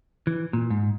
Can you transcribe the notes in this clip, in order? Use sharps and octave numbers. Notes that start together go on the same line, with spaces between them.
E3
A#2
G#2